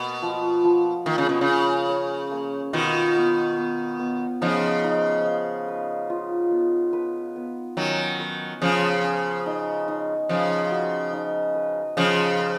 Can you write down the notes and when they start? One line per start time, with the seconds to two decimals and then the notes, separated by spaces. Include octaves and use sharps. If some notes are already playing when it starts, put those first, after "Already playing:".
Already playing: B2 A#3
0.22 F3
0.64 F3
1.06 D#3 A#3
1.18 C#3
1.29 B2
1.41 C#3
1.48 C#4
1.89 C#5
2.31 A#3
2.73 B2 D#3 F4
3.16 B3
3.57 B3
3.99 B3
4.41 C#3 F3 D#4
4.84 D#4
5.26 F5
5.68 B4
6.10 F4
6.51 B3
6.93 B4
7.36 B3
7.77 D#3 F#3 C#4
8.20 B4
8.61 C#3 F3 C#4
9.03 C#4
9.46 D#4
9.88 D#4
10.29 C#3 F3 F5
10.71 F#4
11.13 D#4
11.55 B4
11.97 C#3 F3 B4
12.39 B4